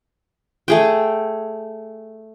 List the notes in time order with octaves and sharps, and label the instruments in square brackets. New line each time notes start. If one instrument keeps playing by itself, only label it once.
[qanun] A3 G#4 G5